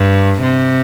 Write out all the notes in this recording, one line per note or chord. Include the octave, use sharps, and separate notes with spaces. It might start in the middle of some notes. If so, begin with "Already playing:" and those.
Already playing: G2
C3